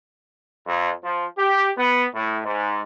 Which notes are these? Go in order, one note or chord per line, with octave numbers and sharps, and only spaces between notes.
F2
F3
G4
B3
A2
G#2